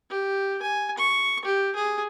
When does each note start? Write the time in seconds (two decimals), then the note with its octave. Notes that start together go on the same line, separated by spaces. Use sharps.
0.10 G4
0.62 G#5
0.98 C#6
1.45 G4
1.76 G#4